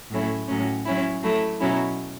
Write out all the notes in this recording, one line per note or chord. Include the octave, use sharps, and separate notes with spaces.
A2 F#3 A3 C#4 E4
A2 F#3 C#4
F#3 C#4 E4
F#3 A3 E4
B2 F#3 C#4 E4